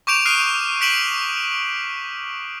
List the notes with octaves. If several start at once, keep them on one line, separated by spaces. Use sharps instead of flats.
C#6 D6 G6 D7 E7 F7
D#6 F6 F#6 C7 D7 D#7
F#6 B6 D7 E7 F#7